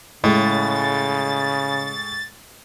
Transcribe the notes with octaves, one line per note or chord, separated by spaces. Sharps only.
A2 C#3 G#3 A6